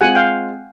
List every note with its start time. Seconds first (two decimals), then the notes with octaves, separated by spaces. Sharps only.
0.01 G#3 C4 F4 F#5 G#5
0.15 F5 G5